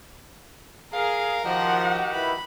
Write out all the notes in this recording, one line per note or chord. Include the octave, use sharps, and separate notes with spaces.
G#4 A#4 F5
D#3 F3 F#4 G4 F#5
E4 B4 B5